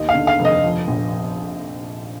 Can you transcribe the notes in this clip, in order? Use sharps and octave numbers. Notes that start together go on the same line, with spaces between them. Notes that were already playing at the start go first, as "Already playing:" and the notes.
Already playing: D#2 D#5
F5
D3
F5
F1
D#5
F3
A#1